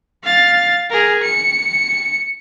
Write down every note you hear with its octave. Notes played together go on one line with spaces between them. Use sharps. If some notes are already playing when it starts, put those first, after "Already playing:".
F5 A6
G#4 A#4
C#7